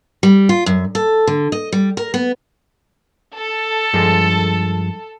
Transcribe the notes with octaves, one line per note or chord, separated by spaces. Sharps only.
G3
F4
F#2
A4
D3
D#5
G3
A#4
B3
A4
G2 F3 G#3